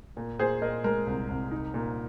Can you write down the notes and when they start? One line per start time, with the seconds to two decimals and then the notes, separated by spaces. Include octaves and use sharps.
0.17 A#2
0.39 A#2 G#4 C5
0.62 A#2 A#4 D#5
0.84 G#3 A#4
1.07 C2
1.29 C2
1.51 D#4
1.74 A#2